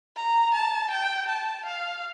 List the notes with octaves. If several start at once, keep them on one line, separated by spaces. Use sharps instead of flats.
A#5
A5
G5
A5
F5